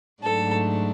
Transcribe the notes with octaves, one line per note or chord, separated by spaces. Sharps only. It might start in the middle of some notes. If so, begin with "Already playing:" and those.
G#2 F#3 A3 D4 A4